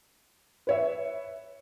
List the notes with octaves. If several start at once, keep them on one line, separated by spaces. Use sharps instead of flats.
B4 C#5 E5